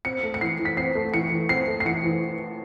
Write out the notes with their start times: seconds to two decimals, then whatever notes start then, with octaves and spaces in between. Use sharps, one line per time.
0.05 C4 C#7
0.23 A3
0.34 C#7
0.41 E3 C7
0.59 E3
0.65 B6
0.77 C4 C7
0.95 A3
1.14 E3 C#7
1.31 E3
1.49 C4 C7
1.68 A3
1.80 C7
1.85 E3 C#7
2.04 E3